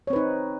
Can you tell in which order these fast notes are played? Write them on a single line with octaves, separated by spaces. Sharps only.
C#5 C4 B4 D#4